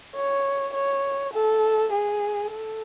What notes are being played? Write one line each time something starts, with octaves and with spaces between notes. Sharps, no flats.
C#5
C#5
A4
G#4
A4